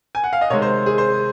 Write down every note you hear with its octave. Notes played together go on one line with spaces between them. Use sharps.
G#5
F#5
F5
D#5
C3 D#3 G#3 C#5
C5
G#4
C5